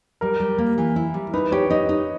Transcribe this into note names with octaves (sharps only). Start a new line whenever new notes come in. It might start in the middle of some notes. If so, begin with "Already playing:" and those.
G3 A#4
G3
A#3
E3
E4
G3
D#4 B4
G4 C#5
D#4 D#5
D#4